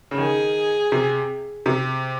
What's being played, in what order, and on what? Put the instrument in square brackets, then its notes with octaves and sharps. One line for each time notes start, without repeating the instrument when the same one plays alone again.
[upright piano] C#3
[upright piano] D#3 [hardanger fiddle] G#4
[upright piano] C3
C3